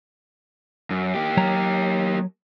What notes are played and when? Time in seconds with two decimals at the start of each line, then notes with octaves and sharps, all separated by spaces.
0.91 F#2
1.15 A#3 G4
1.37 F#3 C#5 A#5